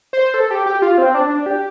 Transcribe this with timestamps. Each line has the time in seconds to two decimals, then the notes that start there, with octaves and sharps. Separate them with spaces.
0.13 C5
0.34 A4
0.51 G4
0.66 G4
0.82 F4
0.98 C4
1.14 D4
1.30 D4
1.46 G4